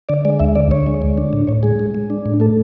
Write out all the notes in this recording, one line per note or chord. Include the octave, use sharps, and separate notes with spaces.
D3 D5
G#3 D5
D2 E5
D3 D5
D2 C#5
G#3
D3
D4
A2
A2 C#5
G#3 G#4
G#3
G#3
D4
A2
A3 A4